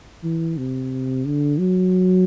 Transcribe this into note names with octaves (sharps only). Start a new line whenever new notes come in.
E3
C3
D3
F#3